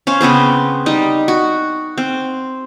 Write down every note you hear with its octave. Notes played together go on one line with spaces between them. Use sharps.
C#4 C5 F5
C#3 B3 C4 C5
G3 D#4
F#4
C4